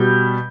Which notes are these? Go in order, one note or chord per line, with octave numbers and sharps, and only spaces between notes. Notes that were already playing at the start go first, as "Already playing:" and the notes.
Already playing: B2 G3 G6